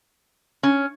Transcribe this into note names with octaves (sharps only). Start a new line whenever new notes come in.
C#4